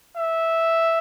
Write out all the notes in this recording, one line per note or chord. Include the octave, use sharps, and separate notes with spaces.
E5